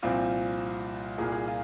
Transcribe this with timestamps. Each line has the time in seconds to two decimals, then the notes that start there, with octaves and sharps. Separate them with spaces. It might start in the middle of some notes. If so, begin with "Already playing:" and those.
0.02 C2 A#2 F3 C4 F4
1.18 C2 A#2 A#3 G#4
1.32 G#4
1.48 F4